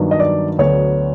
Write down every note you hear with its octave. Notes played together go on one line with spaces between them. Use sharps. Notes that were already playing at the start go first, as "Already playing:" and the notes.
Already playing: G2 D#3 F#3 B3 D4
D#5
D5
D2 D3 F#3 B3 C#5